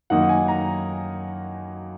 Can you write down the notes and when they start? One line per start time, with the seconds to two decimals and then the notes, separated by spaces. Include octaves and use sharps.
0.10 F#2 D#3 A#3 D#4 F#5
0.29 G#5
0.48 A#5